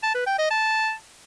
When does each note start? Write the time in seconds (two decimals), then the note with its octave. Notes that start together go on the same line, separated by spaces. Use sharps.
0.03 A5
0.15 B4
0.27 G5
0.39 D#5
0.51 A5